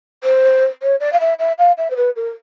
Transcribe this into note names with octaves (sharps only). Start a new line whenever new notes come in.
C5
C#5
D5
F5
E5
E5
F5
E5
C5
B4
A#4